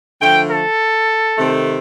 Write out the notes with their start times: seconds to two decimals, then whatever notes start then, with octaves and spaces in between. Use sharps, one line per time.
0.20 D3 F3 A3 G5
0.51 A4
1.38 C3 D#3 A3 C4